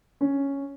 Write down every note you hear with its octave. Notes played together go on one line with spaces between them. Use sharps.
C#4